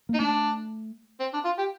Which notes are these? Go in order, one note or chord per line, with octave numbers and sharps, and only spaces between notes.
A#3
D#4
A3 D4
C4
D4
F4
G4